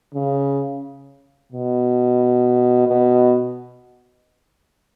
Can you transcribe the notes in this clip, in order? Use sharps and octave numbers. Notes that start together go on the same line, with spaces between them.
C#3
B2
B2